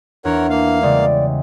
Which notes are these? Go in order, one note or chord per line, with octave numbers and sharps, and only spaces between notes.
E2 D4 A#4 C#5 F#5
A#3 F5
C#3 G3 G#3 D5